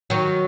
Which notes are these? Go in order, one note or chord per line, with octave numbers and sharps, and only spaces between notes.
D#3 F#3